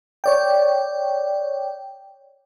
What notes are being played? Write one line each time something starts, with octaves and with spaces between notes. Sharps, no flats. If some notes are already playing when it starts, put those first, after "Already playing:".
C#5 D5 G5